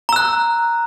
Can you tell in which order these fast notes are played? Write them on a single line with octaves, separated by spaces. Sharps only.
A#5 E6 F#6